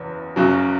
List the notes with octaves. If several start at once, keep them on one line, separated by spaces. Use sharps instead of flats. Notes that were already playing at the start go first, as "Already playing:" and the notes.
Already playing: F#1 E2
F#1 F#2 C#3 F#3